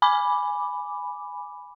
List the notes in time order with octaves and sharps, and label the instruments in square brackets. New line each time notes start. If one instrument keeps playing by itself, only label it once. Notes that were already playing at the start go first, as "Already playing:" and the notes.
[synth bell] G#5 B5 D6